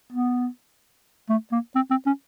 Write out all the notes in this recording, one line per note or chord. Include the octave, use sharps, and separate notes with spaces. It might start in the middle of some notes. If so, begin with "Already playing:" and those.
B3
A3
A#3
C4
C4
C#4